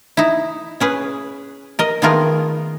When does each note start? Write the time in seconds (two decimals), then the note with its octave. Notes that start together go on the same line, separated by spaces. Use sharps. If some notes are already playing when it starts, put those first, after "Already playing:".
0.17 D#4 E4
0.80 C#4 G#4 B4
1.79 A#4 D#5
2.02 D#3 A3 B3 F4 G#4 A#4